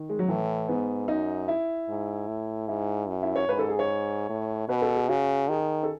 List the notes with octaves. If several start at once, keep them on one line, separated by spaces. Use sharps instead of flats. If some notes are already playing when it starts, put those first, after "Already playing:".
Already playing: D#3
G#3
F#3
A2 E3
G#2 B3
F#2 D#4
E4
G#2
A2
G#2 E4
F#2
E4
C#5
G#2 B4
A4
G#4
C#5
A2
B2 B4
A4
G#4
C#3 F#4
D#3 G#4
A4